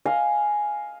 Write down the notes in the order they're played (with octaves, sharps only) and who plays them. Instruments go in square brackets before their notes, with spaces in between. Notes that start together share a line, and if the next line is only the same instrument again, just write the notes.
[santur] D#5 F5 G#5